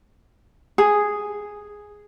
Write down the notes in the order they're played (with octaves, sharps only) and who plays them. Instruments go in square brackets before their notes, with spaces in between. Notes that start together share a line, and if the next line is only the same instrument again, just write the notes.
[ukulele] G#4